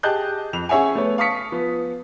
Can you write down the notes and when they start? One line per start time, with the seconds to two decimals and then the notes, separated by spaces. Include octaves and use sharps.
0.03 G4 G#4 D#5 A5 F#6 G6
0.53 F2 F7
0.69 C#4 G#4 C#5 E5 F#5 G#5
0.95 A3 B3 C#5
1.18 F5 A5 C#6 D#6 B6 C#7
1.52 F3 B3